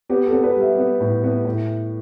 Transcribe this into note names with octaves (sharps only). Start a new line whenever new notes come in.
B3 G4
A4
B3
B4
G3
E5
B3
A2
B3
A2